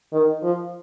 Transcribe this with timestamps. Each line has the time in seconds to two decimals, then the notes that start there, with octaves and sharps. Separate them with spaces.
0.13 D#3
0.43 F3